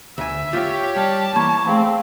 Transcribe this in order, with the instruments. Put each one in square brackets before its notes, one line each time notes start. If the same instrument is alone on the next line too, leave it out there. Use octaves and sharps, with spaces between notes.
[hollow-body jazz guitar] D2 G#5 [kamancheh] E5
[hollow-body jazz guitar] F4 [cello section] G4 C#5 [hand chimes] G6 B6
[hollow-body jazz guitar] G3 [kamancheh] A5 [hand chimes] F6
[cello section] E3 [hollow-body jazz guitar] A#3 [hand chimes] B5 C#6 G#6
[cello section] A3 [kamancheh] C4 [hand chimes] G#4 F5